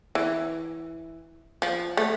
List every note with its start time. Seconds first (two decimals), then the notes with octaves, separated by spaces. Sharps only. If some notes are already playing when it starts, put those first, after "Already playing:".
0.15 E3
1.62 F3
1.97 A3